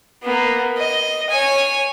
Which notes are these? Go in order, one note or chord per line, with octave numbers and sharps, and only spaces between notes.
A#3 B3
D#5
C#5 G#5